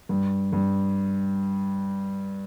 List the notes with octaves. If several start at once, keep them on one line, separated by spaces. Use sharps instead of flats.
G2
G2